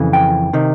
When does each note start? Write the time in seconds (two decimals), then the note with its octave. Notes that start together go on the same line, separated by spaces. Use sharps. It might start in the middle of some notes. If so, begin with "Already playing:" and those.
Already playing: F2 C#3 E3
0.13 G5
0.53 C3 D#3